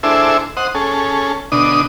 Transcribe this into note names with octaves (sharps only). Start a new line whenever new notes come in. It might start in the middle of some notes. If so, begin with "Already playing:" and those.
D4 E4 G#4 A4 C5 E5
C5 D#5 F#5
C#4 G#4 A4
B2 D3 D4 D#5 D#6